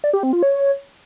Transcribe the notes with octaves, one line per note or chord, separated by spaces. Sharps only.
D5
G4
C4
F4
C#5